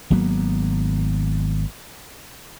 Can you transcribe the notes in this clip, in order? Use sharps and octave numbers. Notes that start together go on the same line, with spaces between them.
G#1 F#3 A#3 B3